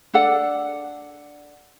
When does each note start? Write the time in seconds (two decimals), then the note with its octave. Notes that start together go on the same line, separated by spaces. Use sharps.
0.14 D4 A4 D5 F#5